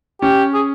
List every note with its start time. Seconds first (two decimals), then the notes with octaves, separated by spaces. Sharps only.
0.22 C#4 G4
0.54 G#4